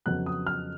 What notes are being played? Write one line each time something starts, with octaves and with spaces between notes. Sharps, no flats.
F2 C#3 F#3 B3 F#6
D#6
F6